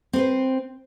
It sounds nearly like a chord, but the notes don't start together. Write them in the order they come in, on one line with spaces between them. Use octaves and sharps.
C4 C5 B4